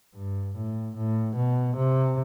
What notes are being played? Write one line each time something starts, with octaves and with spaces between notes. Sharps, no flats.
G2
A2
A2
B2
C3